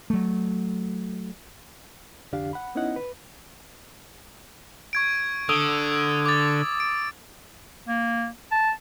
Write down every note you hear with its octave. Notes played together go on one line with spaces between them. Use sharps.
F#3 A3
C2 F2 D3 D4 G4 F5
F#5 B5
B3 C#4 D#4 E4 D#5 F#5
B4
C#6 G#6 D7
D3 D#6 E6
D6 A6
D7
A#3
A5